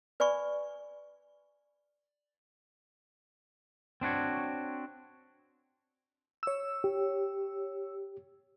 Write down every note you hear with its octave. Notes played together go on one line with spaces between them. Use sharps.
B4 D5 G#5 B5 C#6
C4 D4 F#4 C#5
C#5 E6
G4